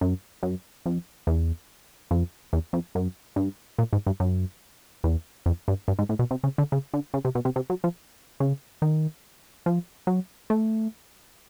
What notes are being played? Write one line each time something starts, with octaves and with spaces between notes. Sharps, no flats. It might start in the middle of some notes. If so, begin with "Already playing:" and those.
F#2
F#2
F2
E2
F2
E2
F2
F#2
G2
A#2
G#2
G2
F#2
E2
F2
G2
G2
G#2
A2
B2
C3
C#3
D3
C#3
D3
C#3
C3
B2
C3
C3
F#3
F3
C#3
D#3
F3
F#3
A3